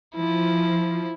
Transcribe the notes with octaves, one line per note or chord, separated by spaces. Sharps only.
F3 E4